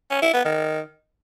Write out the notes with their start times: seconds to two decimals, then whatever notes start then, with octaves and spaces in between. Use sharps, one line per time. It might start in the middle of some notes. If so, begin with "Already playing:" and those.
0.11 C#4
0.22 E4
0.33 B3
0.45 D#3